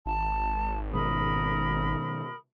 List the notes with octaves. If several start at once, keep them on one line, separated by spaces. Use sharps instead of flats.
G#1 A5
B2 D#3 G#3 A#4 B5 D#6